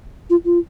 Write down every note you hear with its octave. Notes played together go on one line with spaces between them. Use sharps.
F4
F4